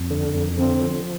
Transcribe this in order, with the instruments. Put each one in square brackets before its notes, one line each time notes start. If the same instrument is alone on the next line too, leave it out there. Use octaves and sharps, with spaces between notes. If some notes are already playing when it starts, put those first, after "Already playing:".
Already playing: [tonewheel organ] F2
D3
F2
[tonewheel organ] D3 [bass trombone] C4
[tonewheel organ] F3